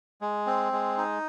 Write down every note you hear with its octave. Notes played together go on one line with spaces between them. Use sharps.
G#3
C4
G#3
D#4